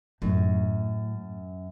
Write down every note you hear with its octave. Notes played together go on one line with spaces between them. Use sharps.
F#2 A2